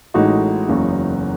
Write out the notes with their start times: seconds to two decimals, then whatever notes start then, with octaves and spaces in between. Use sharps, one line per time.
0.14 A1 A2 G#3 D#4 F#4
0.68 F#1 E2 C#3 F#3